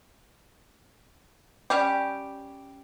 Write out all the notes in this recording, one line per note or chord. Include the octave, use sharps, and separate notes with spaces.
G3 C#4 G4